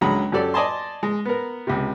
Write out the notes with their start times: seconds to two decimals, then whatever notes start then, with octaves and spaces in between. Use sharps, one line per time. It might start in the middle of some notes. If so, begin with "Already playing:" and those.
0.01 C#2 D3 F#3 G#3 A#5 B5
0.32 F#2 F#3 G4 A4 D5
0.54 D5 D#5 G#5 A5 C6
1.03 G#3
1.25 B3 A#4
1.67 C#2 C3